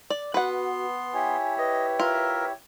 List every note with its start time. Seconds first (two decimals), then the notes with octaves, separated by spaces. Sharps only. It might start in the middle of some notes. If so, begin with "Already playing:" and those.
0.10 D5
0.34 B3 F#4 B4 F#5 C6
1.14 E4 G4 C#5 G#5
1.58 B4 D#5
2.00 F4 A#4 E5